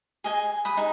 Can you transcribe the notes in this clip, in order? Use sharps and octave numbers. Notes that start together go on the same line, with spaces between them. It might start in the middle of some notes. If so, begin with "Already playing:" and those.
G#4 D#5 G#5
B5 D#6
D#4 G#4